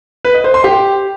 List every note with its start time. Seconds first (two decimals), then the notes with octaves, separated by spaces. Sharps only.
0.25 B4
0.34 D#5
0.44 C5
0.54 C6
0.64 G4